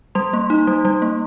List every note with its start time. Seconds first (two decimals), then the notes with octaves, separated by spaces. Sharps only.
0.15 G3 C6
0.33 A#3
0.50 D#4
0.67 G3
0.85 G3
1.02 A#3